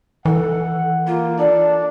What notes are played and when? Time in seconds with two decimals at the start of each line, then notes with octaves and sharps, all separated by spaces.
0.25 E3 A4 F#5
1.07 A#3 F4
1.39 D4 A4 D5